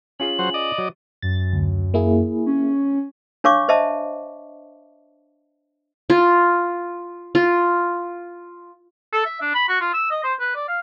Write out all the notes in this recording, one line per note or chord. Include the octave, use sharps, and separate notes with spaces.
C#4 F4 G#4 F#7
F#3 C5
D5 D#5
F#3
F#2 A6
D2
A#3 E4 G#4
C#4
D4 C#5 F5 C#6 D6
C5 D#5 E5 A5
F4
F4
A4
E5
D4
B5
F#4
F4
E6
D#5
C5
B4
D5
F5